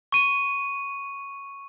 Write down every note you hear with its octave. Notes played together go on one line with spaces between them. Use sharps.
C#6 D#7